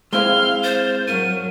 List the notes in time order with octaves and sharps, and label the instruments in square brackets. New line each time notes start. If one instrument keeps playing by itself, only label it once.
[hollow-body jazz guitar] G#3 C4 E4 [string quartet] F5 [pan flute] F6 [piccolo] G7
[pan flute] C5 [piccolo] A6
[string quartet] F#3 [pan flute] A#4 [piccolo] D#7